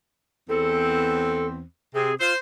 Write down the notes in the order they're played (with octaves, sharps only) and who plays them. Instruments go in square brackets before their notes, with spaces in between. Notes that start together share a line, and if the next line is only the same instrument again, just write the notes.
[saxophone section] E2 C4 [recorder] A4
[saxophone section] C3 [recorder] G#4
[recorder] F4 [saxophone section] C5